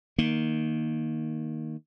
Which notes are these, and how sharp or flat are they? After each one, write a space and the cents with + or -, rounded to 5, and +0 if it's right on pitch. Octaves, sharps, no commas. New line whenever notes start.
D#3 +0 A#3 +0